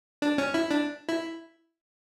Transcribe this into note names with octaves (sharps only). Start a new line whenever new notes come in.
D4
C#4
E4
D4
E4